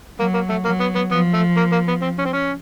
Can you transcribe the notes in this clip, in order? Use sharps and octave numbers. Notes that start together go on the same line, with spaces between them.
F#3 A#3
A#3
A3
F#3 A#3
B3
B3
F3 B3
A3
A#3
A#3
B3
C4
C#4
C4
C#4